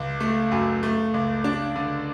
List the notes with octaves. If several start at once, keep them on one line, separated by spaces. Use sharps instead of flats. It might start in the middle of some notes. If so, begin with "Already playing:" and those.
Already playing: C#2
A3
F#2
A3
C#2
D4
D3